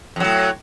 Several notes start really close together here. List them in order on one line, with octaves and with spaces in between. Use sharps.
F2 F#3 A2